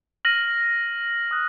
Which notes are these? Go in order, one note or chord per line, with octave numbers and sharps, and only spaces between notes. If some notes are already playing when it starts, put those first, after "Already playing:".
F6 A#6 D#7 F#7
D#6 F#6